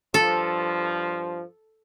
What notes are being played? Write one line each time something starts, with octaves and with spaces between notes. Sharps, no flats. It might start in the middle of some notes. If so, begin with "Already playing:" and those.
G2 F3 A4